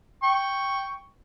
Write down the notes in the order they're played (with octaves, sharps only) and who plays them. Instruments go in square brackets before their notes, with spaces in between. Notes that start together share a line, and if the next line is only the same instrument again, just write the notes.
[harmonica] G5 C#6